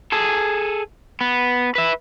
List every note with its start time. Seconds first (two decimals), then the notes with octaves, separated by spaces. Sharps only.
0.12 G#4 A4
1.21 B3
1.75 B4 E5